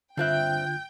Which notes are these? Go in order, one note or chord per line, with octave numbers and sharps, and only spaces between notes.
G2 D3 C4 F4 E5 G5 F#6 G6